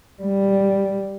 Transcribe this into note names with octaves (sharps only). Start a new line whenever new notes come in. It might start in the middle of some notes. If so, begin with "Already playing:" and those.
G3